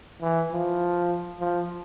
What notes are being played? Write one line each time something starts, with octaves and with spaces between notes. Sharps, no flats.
E3
F3
F3